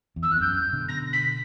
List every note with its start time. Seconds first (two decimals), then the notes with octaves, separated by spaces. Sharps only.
0.16 E2
0.23 E6
0.30 E2 F#6
0.40 F#2 G6
0.73 B2 D3
0.89 A#6
1.13 B6